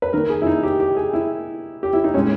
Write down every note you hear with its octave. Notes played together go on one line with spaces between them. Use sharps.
B4
D#3 A#3 A#4
G#4
E4
D#4
G4
G4
G#4
E4
G4
E4
D#4
A#2 G#3 C#4